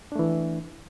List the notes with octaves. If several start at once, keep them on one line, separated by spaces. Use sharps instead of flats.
E3 A3 D4